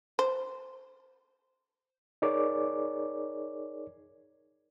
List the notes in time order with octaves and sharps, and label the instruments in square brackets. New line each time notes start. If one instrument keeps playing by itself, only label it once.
[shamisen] C5
[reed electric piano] D#4 G#4 A#4 C#5 D5 D6